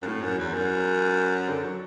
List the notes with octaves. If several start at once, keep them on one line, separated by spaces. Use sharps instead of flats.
F#2
A2
F#2
E2
F#2
D3
F#3